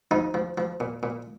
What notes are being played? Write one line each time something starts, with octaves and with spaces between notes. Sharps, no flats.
F3 D#4
F3
F3
A#2
A#2